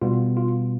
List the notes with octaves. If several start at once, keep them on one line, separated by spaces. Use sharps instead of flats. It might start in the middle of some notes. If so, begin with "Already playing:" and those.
B2 G3 B3 F4
F4